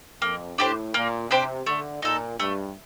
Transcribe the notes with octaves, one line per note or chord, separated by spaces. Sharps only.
F2 A#3
A2 D4 G4 C5
A#2 A#3
C3 D4 G4 C5
D3 A3
A#2 D#4 A4
G2 A3